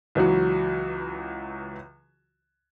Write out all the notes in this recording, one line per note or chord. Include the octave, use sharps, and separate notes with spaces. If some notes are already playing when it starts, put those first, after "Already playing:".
C#2 E3 F#3 F#4